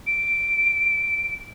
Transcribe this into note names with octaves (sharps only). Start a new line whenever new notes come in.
D7